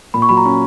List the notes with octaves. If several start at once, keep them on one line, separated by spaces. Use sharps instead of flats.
A#2 B5
C#6
F#3 B5
A#5
C#4